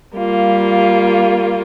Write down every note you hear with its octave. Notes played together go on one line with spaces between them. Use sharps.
G3 A#3 F4